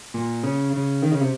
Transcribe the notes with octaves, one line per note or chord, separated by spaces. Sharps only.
A#2
C#3
C#3
D#3
C#3
C3